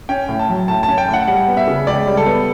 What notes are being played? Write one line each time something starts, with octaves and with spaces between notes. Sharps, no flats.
C#4 G5
A2
A5
F#3
A2 A5
C#4 A5
G5
A2
F#5
G3 F#5
B3
E5
C#3
C#2 D5
G3
A4
B3